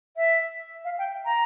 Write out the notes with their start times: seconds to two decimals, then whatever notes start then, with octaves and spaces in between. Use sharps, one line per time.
0.17 E5
0.85 F5
0.98 G5
1.25 A#5